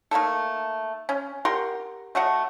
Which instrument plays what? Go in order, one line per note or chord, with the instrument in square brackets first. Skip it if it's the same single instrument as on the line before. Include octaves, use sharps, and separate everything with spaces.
[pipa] A3 A#3 D#4 A4
C#4
G4 A#4 F#5 C6
A3 F#4 D#5 F#5